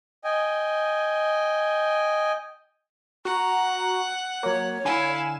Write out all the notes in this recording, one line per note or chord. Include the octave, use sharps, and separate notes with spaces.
D#5 G5 G#5
F#4 F#5 A#5
F#3 A#3 C#5
D3 E4 F5 G#5 E7